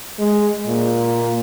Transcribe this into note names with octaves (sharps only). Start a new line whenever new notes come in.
G#3
A#2